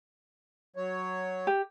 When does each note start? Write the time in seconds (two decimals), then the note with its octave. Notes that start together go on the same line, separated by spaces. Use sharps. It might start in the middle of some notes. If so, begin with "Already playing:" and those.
0.76 F#3 C#5
1.47 G4